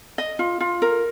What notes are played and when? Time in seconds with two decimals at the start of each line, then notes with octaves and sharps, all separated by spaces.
0.18 D#5
0.39 F4
0.61 F4
0.82 A#4